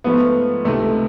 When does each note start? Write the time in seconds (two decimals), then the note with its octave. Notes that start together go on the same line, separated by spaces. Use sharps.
0.04 G#2 F3 A3 B3
0.65 C#2 C3 D#3 A3